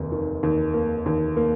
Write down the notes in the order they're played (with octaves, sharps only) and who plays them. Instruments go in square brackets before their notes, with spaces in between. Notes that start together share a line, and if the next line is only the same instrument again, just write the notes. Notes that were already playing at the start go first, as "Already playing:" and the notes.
Already playing: [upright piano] F1 D#2 D#3
D#3
D#2
A#3
D#2
A#3